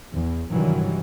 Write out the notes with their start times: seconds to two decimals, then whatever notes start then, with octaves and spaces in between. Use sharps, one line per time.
0.12 E2
0.50 G2 C3 D#3 E3 F#3 G3